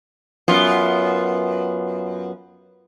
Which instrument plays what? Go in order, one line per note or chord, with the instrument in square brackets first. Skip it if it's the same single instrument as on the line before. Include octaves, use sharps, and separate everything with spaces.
[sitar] F#2 B3 F4